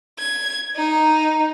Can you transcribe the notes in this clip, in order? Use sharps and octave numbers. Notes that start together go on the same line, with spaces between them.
G#6
D#4